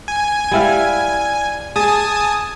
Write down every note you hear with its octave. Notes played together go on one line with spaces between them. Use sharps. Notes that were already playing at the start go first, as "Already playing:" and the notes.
G#5
G3 E4 F5
G#4 G#5 A5 D#6